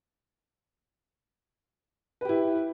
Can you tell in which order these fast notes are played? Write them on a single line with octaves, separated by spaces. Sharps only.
B4 G4 E4